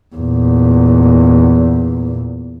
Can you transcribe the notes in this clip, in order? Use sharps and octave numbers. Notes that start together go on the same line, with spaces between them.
E2 A#2